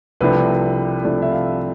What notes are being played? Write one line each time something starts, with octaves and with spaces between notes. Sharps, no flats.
C2 C3 F3 A3 D4 B4
C2 C3 F3 A3 D4
E5
F5